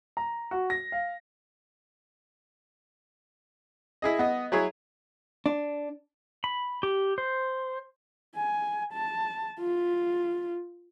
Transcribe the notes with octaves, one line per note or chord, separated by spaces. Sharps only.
A#5
F#4
A#6
F5
E4 G#4 D#5
B3 D#5
F#3 E4 G#4 C#5
D4
B5
G4
C5
G#5
A5
F4